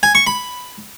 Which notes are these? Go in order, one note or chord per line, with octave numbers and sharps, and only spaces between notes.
G#5
C#6
B5